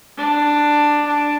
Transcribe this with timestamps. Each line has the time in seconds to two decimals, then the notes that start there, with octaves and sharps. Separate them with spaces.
0.17 D4
1.07 D4